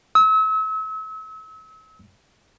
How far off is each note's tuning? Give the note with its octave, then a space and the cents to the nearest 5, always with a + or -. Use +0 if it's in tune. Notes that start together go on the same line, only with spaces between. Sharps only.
E6 -35